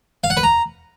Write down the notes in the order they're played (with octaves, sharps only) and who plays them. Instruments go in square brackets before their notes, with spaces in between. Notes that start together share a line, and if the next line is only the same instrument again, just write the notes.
[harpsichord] F5
F#5
B4
A#5